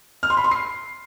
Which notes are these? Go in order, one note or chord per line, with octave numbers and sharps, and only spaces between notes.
F6
C6
B5
C6
C7